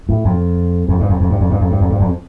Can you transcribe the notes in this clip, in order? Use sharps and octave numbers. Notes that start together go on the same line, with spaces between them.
A2
F2
F2
G2
F2
F2
G2
F2
G2
F2
G2
F2
G2
F2